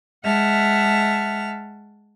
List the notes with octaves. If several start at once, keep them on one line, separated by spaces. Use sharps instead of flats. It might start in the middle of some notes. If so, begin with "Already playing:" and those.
G#3 E5 F#5 A5 F6